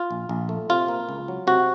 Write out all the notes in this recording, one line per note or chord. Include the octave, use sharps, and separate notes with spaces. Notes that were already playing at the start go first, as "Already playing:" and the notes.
Already playing: F4
A#1
A#1
A3
C3 F4
A#3
C#2
F#3
C3 F#4